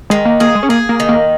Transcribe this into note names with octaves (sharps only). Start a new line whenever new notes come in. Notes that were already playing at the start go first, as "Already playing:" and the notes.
D#3 G#3
A#3
A#3 G#4
G#3
C#4
A#3 G#4
A#3
D#3
A#3